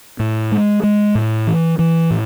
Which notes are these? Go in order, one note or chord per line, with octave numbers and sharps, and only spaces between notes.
A2
G#3
G#3
A2
E3
E3
A2